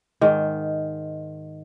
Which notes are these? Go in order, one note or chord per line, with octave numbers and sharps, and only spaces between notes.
G#2 D#3